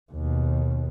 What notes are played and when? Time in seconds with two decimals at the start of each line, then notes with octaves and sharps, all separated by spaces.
0.13 D#2 B2